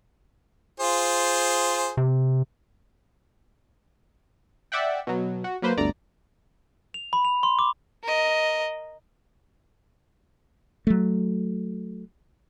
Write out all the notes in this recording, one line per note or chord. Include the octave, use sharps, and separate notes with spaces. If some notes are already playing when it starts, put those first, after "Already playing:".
F4 G#4 C5
C3
D5 E5 F#5 G5
B2 F#3
F#4
F#3 A#3 B4 C5
G1 D2 D5 A#5
F7
B5
F7
C6
D6
A#4 D#5
F#3 A3